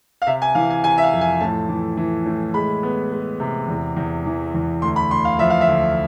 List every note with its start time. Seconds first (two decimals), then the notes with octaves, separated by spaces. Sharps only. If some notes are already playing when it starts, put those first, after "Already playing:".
0.22 F5
0.27 C3 E5
0.42 G#5
0.55 E3 F5
0.70 G#5
0.84 C3 G#5
0.98 E5
1.04 F5
1.13 F2
1.21 G#5
1.41 A2 A5
1.69 E3
1.97 E3
2.26 A2
2.54 G#3 B5
2.83 B3
3.12 G#3
3.40 C3
3.68 E2
3.97 E2
4.26 E3
4.54 E2
4.82 D2 C6
4.96 B5
5.10 D2 C6
5.25 F5
5.39 F3 E5
5.50 F5
5.61 E5
5.68 D2